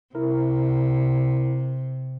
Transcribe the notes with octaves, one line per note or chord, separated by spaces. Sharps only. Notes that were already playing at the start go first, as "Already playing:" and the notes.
C3 E4 A#4